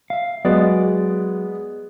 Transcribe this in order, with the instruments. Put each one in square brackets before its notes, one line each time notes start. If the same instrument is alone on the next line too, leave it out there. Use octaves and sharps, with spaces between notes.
[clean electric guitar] E5 F5
[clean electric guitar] F#3 F#4 D5 [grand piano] G#3 B3